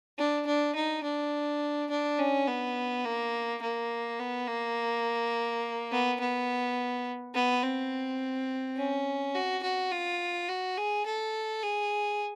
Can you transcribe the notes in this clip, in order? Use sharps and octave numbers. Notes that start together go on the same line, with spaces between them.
D4
D4
D#4
D4
D4
C#4
B3
A#3
A#3
B3
A#3
B3
B3
B3
C4
C#4
F#4
F#4
F4
F#4
G#4
A4
G#4